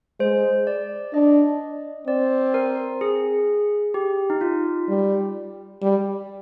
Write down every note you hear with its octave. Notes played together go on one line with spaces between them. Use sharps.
G#3 C5
D5
D4 D#5
C4 D5
A#4
G#4
G4
D#4
F4
G3
G3